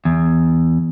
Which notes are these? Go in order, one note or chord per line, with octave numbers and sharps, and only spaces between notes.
E2